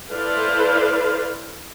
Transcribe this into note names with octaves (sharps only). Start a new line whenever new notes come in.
E4 A4 B4 C5 D5 F5